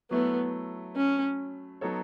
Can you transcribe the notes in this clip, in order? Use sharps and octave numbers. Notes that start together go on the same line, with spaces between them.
F#3 A3 B3 E4
C#4
F#3 B3 D#4 A4 C#5